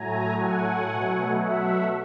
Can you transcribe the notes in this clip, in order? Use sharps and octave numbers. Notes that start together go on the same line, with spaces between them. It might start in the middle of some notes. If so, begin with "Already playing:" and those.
Already playing: A2 F#3 A3 G#5 A#5
F#5 G#5
B2 F#3 A3
E5 F#5